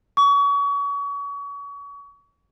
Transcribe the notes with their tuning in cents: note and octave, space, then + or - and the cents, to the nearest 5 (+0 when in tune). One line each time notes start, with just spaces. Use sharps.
C#6 +35